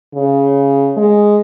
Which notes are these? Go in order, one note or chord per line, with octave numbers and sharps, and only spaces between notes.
C#3
G#3